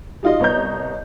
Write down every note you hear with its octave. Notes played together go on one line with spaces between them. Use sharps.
G3 D#4 F4 F#4 D#5
C2 B3 C#5 D#5 A#5 G6